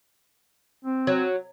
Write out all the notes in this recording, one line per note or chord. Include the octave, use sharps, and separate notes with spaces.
C4
F#3